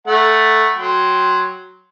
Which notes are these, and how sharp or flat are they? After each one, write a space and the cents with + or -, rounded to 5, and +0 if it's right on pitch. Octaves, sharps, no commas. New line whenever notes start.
A3 +0 F#5 +0 A#5 +35
F#3 +0 G5 +0 C6 +0